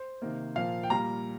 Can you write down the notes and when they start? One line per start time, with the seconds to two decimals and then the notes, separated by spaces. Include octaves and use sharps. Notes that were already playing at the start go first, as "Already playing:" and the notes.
Already playing: C5
0.22 C3 D#3 A#3
0.55 A#2 F3 A#3 F5
0.83 G5
0.90 A#2 G3 A#3 A#5